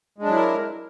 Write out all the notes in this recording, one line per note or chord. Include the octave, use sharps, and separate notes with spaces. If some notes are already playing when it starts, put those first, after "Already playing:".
F#3 G#3 D4 E4 A#4